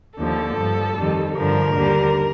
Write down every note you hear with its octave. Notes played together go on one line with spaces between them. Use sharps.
D#2 D3 F3 A4
G2 F3
F2 D#3 G3
G2 D3 F3 A#4
D#2 D3 G3